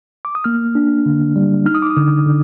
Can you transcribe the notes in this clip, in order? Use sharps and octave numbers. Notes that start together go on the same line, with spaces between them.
D6
D#6
A#3 F6
D4
D3
G3
D#4 F6
D#6
D6
D#6
D3
D3